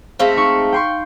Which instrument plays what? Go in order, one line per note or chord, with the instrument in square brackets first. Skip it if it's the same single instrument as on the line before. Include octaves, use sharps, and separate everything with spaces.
[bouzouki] G#3 A3 C4 [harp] F5 A#6 B6
[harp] D#4 C#6
G5 C6 C#6